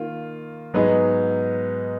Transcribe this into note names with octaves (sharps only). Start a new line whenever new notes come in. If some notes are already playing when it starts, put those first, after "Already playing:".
Already playing: D#3 A#3 F4
G#2 F#3 B3 D#4 G#4